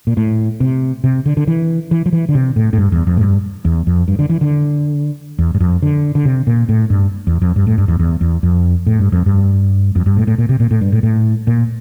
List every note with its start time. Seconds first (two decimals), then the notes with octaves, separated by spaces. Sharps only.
0.07 A#2
0.17 A2
0.60 C3
1.04 C3
1.26 D3
1.37 D3
1.47 E3
1.91 E3
2.06 F3
2.13 E3
2.29 D3
2.35 C3
2.56 A2
2.73 A2
2.78 G2
2.92 E2
3.07 F2
3.17 A2
3.21 G2
3.65 E2
3.87 F2
4.08 G2
4.19 D3
4.30 E3
4.41 D3
5.39 E2
5.55 G2
5.60 F2
5.82 D3
6.15 D3
6.25 C3
6.47 A#2
6.69 A2
6.90 G2
7.27 E2
7.42 F2
7.56 G2
7.67 A2
7.78 G2
7.88 E2
7.99 E2
8.21 E2
8.43 F2
8.87 A2
8.99 G2
9.12 F2
9.26 G2
9.96 F2
10.06 G2
10.17 A2
10.27 A2
10.38 A#2
10.49 C3
10.60 A#2
10.71 A2
10.81 G2
10.93 A2
11.03 A2
11.47 A#2